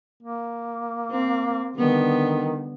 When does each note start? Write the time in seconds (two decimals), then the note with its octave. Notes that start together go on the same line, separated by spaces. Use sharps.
0.23 A#3
1.10 C4
1.76 D3 D#3 G3 B3